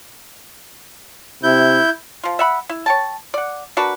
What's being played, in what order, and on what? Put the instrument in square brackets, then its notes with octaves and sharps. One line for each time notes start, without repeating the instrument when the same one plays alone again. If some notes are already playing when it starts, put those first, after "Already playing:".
[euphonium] C3 [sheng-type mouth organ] E4 G6
[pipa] F3 F4
E5 F#5 B5
E4
C#5 G5 A5
D5 F#5
D4 F#4 A#4 B4